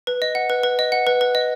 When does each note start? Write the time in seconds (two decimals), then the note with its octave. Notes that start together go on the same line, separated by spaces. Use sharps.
0.07 B4
0.22 D#5
0.35 F#5
0.50 B4
0.63 B4
0.79 D#5
0.92 F#5
1.07 B4
1.21 B4
1.35 D#5